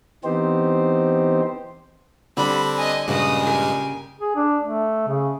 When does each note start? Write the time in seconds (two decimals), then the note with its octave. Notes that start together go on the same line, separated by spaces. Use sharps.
0.24 E3 B3 C4 D#4 G4 C5
2.37 D3 G3 C4 D4 B5
2.76 D#5 G#5
3.08 G2 A#2 C#3 G#3 C#4 F#4 D#6
3.43 G4 G#4 A#4 G#5
4.21 G#4
4.36 D4
4.64 A3
5.07 C#3